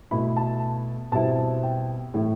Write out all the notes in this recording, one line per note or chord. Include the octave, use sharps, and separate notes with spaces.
B2 A3 E4 B5
A5
B2 G3 C4 E4 A5
G5
A2 E3 A3 E4